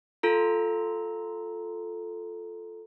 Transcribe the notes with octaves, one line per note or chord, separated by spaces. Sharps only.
F4 A4 A#5